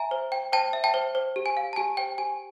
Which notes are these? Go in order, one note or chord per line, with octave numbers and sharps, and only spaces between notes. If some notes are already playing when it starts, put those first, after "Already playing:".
Already playing: E5 G#5 A#5
C5
G5
C5 G5 A5
E5
G5 A5
C5
C5
G4
G#5
F5
A5
G4 G#5
C5 G5
G4 G#5